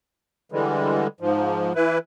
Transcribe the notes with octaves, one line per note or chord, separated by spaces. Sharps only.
D3 E3 G3 G#3
G#2 F3
E3 E4 B4